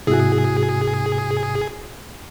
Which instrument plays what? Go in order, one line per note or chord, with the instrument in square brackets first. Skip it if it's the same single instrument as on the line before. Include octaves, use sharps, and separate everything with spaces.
[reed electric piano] G#2 C3 [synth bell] E4 F#4 [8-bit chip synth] G#4